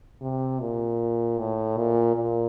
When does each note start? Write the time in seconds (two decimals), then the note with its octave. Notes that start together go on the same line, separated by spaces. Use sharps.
0.21 C3
0.60 A#2
1.39 A2
1.77 A#2
2.15 A#2